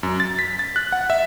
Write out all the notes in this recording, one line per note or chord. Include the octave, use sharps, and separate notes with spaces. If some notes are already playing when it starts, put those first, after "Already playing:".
F#2
A6
B6
A6
F#6
F#5
E5